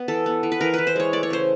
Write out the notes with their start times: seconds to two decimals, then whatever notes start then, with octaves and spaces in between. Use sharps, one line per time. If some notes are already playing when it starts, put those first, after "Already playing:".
Already playing: B3
0.08 E3 A4
0.26 B3
0.43 E3
0.52 B4
0.61 E3 A#4
0.74 E3 B4
0.87 C5
0.96 G#3 C#5
1.13 A3 D5
1.23 C#5
1.30 C#3 C5